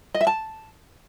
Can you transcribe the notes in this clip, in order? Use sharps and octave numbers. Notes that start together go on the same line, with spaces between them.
D#5
E5
A5